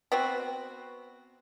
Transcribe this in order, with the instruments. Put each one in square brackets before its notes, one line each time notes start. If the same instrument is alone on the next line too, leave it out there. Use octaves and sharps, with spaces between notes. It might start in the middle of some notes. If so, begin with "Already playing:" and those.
[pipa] B3 C4 F#4